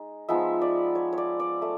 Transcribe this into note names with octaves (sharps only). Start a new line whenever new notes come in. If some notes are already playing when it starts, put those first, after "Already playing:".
Already playing: G#3 D#4
F3 G#3 B3 D#4 E5
D5
C#5
C#5
D5
D5
A3